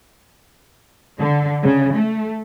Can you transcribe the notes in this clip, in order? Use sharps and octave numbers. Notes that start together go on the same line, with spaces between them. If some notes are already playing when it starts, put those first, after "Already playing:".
D3
C#3
A3